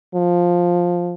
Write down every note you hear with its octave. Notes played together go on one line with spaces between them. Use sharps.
F3